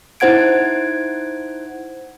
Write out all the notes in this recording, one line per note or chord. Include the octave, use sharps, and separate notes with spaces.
D#4 E4 C5 F#5 G#6 D7